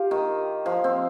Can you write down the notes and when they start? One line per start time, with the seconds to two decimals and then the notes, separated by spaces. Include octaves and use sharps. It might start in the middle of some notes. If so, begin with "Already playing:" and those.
Already playing: F4 G4
0.11 D#3
0.66 F3
0.84 C4